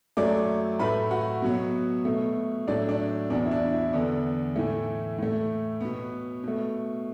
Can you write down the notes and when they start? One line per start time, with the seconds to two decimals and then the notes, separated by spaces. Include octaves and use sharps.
0.17 F#2 F#3 A3 D5 D6
0.79 A2 A3 B4 B5
1.11 F#4 F#5
1.42 B2 F#3 B3
2.05 B2 A3
2.67 A2 F#3 A3 D4 D5
2.88 D4 D5
3.30 E2 B2 B3 D4
3.46 E4
3.51 D4
3.72 E4
3.93 E2 D3 B3 D4
4.56 A2 E3 A3
5.18 A2 A3
5.81 B2 B3
6.44 B2 A3